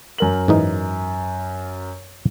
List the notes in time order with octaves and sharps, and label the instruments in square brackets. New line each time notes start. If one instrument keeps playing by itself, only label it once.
[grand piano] F#2 A#4 F#7
[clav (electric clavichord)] G#2 E3 D#4